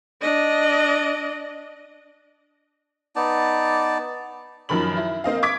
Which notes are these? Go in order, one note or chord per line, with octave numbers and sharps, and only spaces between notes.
D4 D#5
B3 D#4 D5 A5
F#2 D#3 F3 A#4 B5 F#7
E4
A#3 C4 D#5 F5
C#6 D6 G#6 B6 D7